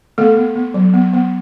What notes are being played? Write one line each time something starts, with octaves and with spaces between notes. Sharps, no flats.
A3 B3 A4
B3
B3
F#3
B3
B3